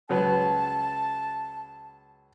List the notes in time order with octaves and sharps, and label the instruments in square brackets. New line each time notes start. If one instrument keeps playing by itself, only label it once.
[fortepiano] C#2 F#3 B4 [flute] A5